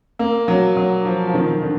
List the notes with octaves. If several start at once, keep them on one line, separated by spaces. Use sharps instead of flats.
A#3
F#3
F#3
F3
F3
D#3
D3